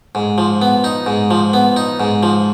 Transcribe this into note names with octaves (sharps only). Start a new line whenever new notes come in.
G#2
F3
B3
D#4
G#2
F3
B3
D#4
G#2
F3